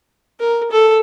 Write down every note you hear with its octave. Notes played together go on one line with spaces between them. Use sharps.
A#4
A4